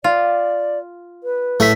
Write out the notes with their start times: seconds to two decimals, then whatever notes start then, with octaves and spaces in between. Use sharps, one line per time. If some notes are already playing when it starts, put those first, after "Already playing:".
0.04 F4 D5
1.24 B4
1.60 A2 A3 B6